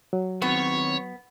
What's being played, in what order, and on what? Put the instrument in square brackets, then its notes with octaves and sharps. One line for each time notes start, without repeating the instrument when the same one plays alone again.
[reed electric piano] F#3
[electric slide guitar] D#3 C4 E4 [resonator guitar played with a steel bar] B3 [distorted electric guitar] C#5